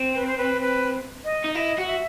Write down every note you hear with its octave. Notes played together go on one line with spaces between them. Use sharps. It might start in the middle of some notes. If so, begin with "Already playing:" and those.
Already playing: C4
B4
C5
B4
B4
D#5
D#4
E4 D#5
F#4 F#5
E5